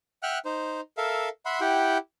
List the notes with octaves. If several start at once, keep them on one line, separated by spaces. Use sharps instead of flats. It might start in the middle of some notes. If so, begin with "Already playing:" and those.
E5 F#5 G5 F6 F#6
D#4 C5
A4 A#4 E5 F5
E5 F#5 B5 C6
E4 G4 F#5 G5